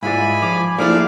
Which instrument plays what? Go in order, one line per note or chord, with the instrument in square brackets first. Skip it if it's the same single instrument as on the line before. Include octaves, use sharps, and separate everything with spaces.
[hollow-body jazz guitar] G#2 G#3 [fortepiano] E4 F4 D5 [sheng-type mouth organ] G#5 B5
[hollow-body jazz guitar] F3 [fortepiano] D6
[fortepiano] A#1 [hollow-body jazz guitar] F3 A3 E4 [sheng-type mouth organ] D5 F5 D6